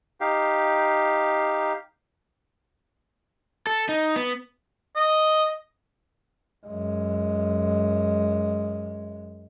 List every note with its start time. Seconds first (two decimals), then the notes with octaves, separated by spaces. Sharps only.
0.21 D#4 G4 F5
3.67 A4
3.89 D#4
4.16 B3
4.96 D#5
6.66 F#2 G#3